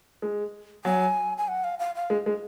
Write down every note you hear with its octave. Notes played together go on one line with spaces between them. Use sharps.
G#3
F#3 G#5
G#5
F#5
F5
F5
F5
G#3
G#3